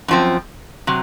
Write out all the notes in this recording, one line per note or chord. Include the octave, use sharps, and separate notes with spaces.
F#2 F3 C4
C3 F#3